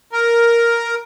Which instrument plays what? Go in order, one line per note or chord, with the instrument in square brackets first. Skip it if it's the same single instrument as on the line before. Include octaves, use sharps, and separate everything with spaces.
[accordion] A#4